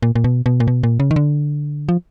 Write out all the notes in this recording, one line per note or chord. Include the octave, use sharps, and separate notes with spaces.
A#2
A#2
B2
B2
A#2
B2
A#2
C#3
D#3
D3
F3